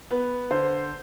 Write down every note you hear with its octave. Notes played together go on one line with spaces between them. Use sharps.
B3 B4
D3 C5